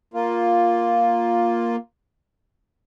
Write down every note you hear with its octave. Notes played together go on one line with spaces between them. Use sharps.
A#3 F4